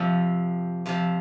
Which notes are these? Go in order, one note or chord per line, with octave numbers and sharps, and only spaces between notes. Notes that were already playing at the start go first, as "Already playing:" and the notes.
Already playing: F2 C3 F3
F2 C3 F3